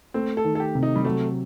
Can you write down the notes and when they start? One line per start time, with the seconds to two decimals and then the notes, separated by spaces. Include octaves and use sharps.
0.14 A3 C4
0.37 A4
0.44 D#3
0.55 A4
0.60 G4
0.75 C3
0.83 D#4
0.96 G3
1.05 F#3 A3